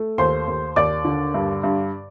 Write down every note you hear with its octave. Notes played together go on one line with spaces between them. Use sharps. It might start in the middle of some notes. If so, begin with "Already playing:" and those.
Already playing: A3
D#2 C5 C6
D#2
D#2 D5 D6
D3
G2
G2